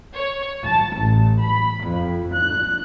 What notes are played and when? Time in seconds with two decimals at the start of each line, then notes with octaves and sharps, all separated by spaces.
0.14 C#5
0.66 A5
0.99 A1
1.44 B5
1.85 F2
2.35 F#6